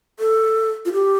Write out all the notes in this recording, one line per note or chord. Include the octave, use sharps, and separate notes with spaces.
A4
F4
G4